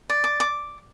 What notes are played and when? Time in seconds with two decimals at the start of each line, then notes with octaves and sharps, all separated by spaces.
0.10 D5
0.24 D6
0.40 D6